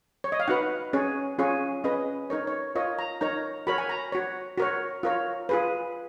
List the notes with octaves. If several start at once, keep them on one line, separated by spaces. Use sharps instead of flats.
C#5
D#5
F5
D#4 F#4 B4 F#5
C#4 G#4 C#5
C#4 F4 G#4 C#5
C#4 G#4 B4 D#5
D#4 A#4 C#5
C#5
F4 A#4 C#5 D#5
A#5
D#4 A#4 C#5 A#5
F#4 A#4 C#5 B5
G#5
A#5
F#4 C#5
F#4 A#4 C#5
F4 A#4 C#5
F4 G#4 B4